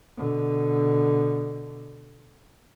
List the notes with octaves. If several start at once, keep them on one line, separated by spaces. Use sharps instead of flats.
B2 D3